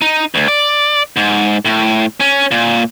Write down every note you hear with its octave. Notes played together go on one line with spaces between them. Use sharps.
D#4
D2
D5
G#2
A2
C#4
A#2